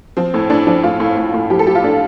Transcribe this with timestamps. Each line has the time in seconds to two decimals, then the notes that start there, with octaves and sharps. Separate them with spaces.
0.17 F3 C4
0.34 A2
0.50 A2 D4
0.67 F3 D4
0.83 A2 F4
1.00 A2
1.17 A2
1.34 A2
1.50 F3 G4
1.59 A4
1.67 F3 G4
1.75 F4
1.84 A2 D4